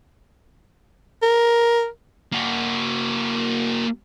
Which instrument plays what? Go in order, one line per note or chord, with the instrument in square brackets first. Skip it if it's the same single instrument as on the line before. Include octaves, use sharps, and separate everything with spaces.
[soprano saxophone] A#4
[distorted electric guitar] A#3 F#4